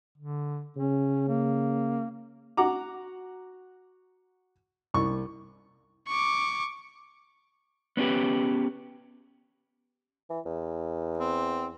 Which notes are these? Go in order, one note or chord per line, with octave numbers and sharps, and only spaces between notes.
D3
C#3 C#4
A#3
F#4 F#5 A#5 D6
C2 C#6
C#6 D6
B3 C#4 D4 G4 B4
E3
E2
C4